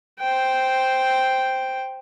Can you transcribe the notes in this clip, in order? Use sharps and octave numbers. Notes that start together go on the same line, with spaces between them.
C5 G5